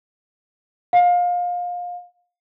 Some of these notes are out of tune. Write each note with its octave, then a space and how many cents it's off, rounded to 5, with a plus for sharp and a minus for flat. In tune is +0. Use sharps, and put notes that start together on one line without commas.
F5 +25